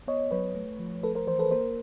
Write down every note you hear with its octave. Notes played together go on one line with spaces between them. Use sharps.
B3 C#5 D#5
F#3 B4 C#5
A3
F3
A3 A4 B4
A#4 C5
E3 A#4 C5
A4 B4
A#3 A#4 C5